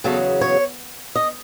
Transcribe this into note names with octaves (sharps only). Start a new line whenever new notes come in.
E2 C#3 F#3 A4
C#5
D#5